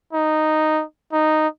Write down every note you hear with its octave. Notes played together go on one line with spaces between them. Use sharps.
D#4
D#4